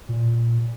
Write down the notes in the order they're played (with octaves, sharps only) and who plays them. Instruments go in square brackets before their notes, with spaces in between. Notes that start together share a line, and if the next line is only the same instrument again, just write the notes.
[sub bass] A#2